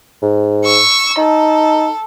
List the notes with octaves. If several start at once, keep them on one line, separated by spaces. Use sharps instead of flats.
G#2
C#6 E6
D#4 A4